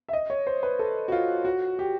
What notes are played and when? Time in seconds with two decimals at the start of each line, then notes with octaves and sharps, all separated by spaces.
0.09 E5
0.13 D#5
0.30 C#5
0.47 C5
0.63 B4
0.79 A4
1.08 F#4
1.12 F4
1.45 F#4
1.79 G4